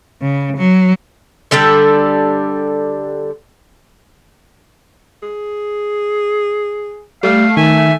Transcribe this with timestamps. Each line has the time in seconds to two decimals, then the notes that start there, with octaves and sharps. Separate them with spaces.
0.22 C#3
0.57 F#3
1.51 D3 G3 D4 A4
5.23 G#4
7.23 G3 A3 F5
7.57 D#3 E5 G#5